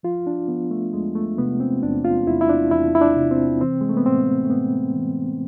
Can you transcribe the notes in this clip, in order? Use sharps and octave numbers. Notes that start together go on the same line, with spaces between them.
F3 F4
D4
F3 B3
A3
E2 G#3
A3
C3 B3
C4
E2 D4
F4
E2 E4
E4
D4
E2 E4
E4
D4
C3
C4
E3 C4
G#3
A3
B3
A2 C4
A3
A2 B3
E3